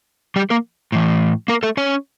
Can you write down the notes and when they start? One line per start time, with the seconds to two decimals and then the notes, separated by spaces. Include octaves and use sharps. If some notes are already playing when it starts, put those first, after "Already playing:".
0.36 G3 G4
0.50 A#3 A#4
0.92 A2 E3
1.48 A#3 A#4
1.63 A3 A4
1.77 C#4 C#5